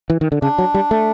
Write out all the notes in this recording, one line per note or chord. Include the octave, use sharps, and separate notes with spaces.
E3
D#3
D3
C#3 D4
F#3
G3
A3